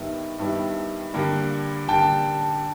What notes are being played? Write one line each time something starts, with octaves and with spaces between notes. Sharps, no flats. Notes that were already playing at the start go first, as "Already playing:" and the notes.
Already playing: G2 D#3 G3 B3 E4
G2 D#3 G3 B3 E4
G2 D3 G3 A#3
G2 D3 G3 A#3 G5 A5